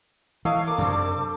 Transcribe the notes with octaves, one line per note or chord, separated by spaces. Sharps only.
E3 A4 C#5 D#5 F5
A#3 A4 D6
F#2 C3 D4 A4 C5